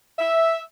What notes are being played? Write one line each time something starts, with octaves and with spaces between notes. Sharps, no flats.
E5